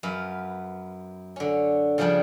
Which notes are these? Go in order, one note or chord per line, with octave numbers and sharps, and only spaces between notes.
F#2 B3 B4 F5
D3 C#4
C#3 F3 G3 C#4 D4